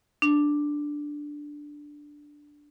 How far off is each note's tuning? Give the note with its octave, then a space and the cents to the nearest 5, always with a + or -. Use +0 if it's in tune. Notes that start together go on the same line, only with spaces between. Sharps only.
D4 +0